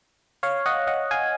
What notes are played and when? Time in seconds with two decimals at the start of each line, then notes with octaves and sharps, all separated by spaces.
0.43 C#5 F5
0.66 D#5 F#5
0.87 D#5 F#5
1.11 F5 G#5